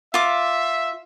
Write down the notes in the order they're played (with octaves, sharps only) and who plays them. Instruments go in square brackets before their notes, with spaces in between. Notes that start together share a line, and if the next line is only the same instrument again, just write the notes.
[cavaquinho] F4 D6 [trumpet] E5